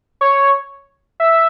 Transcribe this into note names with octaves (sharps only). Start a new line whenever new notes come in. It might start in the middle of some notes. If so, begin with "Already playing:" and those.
C#5
E5